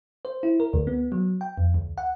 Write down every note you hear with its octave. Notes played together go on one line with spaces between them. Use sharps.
C5
E4
A#4
D2
B3
F#3
G5
F2
D2
F#5